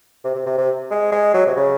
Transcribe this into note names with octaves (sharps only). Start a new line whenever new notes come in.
C3
C3
C3
C3
G#3
G#3
F#3
C3
C#3